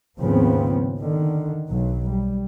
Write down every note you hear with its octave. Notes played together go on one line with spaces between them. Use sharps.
D#2 G#2 C#3 F3 B3 C4
D3 D#3
B1 F#3
G3